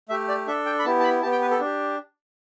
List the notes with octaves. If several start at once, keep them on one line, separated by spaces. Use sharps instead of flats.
A3 G4 E5
D5
D4 A4 E5
G5
B5
B3 E4 G4 A5
A5
B5
B3 G4 A5
G5
B4
A4
D4 G4